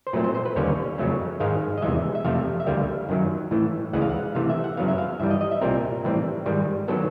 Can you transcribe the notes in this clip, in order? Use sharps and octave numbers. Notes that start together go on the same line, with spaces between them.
C5
A#2 F#3 A3 C4 B4
C5
C5
B4
D#2 D3 G3 A#3 C#4 C#5
F2 C#3 F#3 A3 C#4
G#2 D#3 G#3 F5
D#5
E2 C3 E3 G#3 E5
E5
F2 C3 F3 A3 C4 F5
E5
D2 D3 G3 A#3 F5
F#2 D#3 F#3
A2 E3 A3
D2 C#3 E3 G#3 F#5
F5
F#5
C3 E3 A3 F5
E5
F#5
F#2 C#3 F#3 B3 F5
E5
F5
G2 E3 G3 E5
D#5
D#5
E5
C2 A#2 G3 C4 A#4
A2 E3 G3 C4
G#2 D#3 G3
D#3 F#3 B3 A4